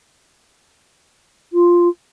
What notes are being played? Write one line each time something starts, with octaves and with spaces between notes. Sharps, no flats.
F4